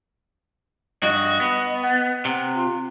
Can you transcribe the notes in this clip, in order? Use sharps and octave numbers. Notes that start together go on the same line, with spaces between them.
G2 F#4 D#5
B3
F#5
C3
F4